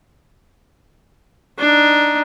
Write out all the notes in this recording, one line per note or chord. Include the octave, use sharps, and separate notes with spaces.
D4 D#4